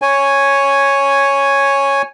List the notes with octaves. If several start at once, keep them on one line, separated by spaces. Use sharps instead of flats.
C#5 G#5